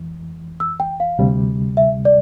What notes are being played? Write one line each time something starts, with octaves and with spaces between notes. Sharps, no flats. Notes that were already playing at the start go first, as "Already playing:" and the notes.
Already playing: F2 E3
E6
G5
F5
D2 C3 G3
E5
D5